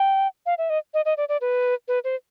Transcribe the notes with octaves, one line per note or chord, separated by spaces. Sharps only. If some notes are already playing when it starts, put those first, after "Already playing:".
Already playing: G5
F5
E5
D#5
D#5
D#5
D5
D5
B4
B4
C5